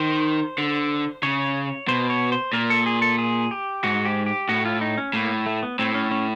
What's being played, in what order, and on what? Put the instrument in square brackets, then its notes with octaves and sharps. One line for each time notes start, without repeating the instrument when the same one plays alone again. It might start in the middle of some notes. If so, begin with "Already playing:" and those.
Already playing: [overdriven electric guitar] D#3 [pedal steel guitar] C5
[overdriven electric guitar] D3
[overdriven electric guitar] C#3 [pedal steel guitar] C#5
[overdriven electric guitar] B2 [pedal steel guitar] C5
[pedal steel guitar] C#5
C5
[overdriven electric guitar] A#2 [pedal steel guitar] A#4
[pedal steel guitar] A4
G#4
A4
G#4
G4
[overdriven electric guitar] G#2 [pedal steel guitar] F#4
[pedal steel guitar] G4
G4
[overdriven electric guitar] A2 [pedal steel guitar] F#4
[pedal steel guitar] F4
D#4
C#4
[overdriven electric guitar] A2 [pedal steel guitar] A#3
[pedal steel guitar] A3
B3
[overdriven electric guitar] A2 [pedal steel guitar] C4
[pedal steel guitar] C#4
C#4